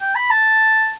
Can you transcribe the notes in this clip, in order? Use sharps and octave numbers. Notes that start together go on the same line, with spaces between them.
G5
B5
A5